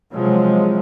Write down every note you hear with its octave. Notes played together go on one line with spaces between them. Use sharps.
C3 F3 F#3 G#3